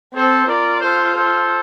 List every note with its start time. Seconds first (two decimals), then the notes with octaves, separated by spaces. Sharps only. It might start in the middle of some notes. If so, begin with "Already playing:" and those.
0.13 C4 A4 C5
0.47 F4 A#4 D5
0.80 A4 C5
1.14 A4 C5